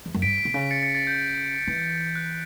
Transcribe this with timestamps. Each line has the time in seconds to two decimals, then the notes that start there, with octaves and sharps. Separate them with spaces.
0.06 E2
0.14 F#2
0.22 G2 B6 D7
0.45 B2
0.54 C#3
0.71 A6 C#7
0.83 A6 C#7
0.95 A6
1.07 G6
1.67 E3
2.15 F#6